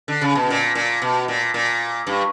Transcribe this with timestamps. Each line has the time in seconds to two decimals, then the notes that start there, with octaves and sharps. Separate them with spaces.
0.08 D3
0.22 C#3
0.35 B2
0.50 A#2
0.75 A#2
1.02 B2
1.28 A#2
1.54 A#2
2.07 G2